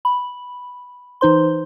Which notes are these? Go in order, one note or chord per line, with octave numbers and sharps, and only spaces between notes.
B5
E3 D#4 C5 C6